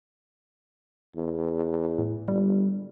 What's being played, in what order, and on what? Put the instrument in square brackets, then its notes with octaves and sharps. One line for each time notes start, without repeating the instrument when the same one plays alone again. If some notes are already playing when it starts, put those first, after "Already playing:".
[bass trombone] E2
[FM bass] A2
[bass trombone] G1 [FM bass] G3